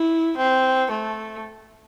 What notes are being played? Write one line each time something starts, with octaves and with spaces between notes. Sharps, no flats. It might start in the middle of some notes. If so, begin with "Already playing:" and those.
Already playing: E4
C4
A3